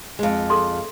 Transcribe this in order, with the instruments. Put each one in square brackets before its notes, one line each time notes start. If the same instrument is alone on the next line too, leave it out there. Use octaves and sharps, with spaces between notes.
[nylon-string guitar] F2 G#3
[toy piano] G#4 A4 C6